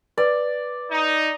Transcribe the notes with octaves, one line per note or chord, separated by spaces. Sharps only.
B4 D5
D#4